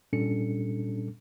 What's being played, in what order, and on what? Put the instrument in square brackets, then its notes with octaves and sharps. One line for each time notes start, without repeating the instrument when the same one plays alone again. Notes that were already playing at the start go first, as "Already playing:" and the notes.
[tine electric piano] A#2 G3 C#4 D4 A4 C#7